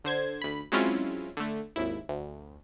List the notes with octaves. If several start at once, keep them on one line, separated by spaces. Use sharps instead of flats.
D3 C5 G#6
D2 B5
F#3 G#3 C4 C#4 E4 F4
D3 A3
G#1 D#2 E4
D2